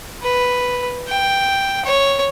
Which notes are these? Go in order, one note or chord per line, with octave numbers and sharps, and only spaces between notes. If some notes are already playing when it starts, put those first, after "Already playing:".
B4
G5
C#5